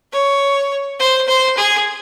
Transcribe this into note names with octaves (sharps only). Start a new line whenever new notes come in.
C#5
C5
C5
G#4